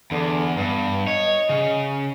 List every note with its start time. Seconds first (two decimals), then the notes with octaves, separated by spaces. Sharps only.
0.11 E2 D3
0.57 G2 B3
1.07 C#5 D#5
1.49 C#3